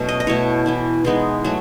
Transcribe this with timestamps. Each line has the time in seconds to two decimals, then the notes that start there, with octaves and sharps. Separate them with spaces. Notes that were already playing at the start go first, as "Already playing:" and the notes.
Already playing: B2 F#3 A3 C#4
0.09 D#5
0.20 D#5
0.27 B2 A3 E4 C#5
0.66 E3 B3 E4
1.05 E3 G#3 B3 D#4
1.45 F#3 A3